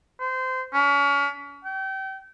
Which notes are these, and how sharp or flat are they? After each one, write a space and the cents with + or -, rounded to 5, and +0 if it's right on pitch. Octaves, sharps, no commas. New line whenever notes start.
C5 -25
C#4 +35
G5 -30